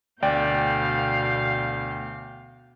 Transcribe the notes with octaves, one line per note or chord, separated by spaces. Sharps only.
D2 B2 D5 F5 G5 G6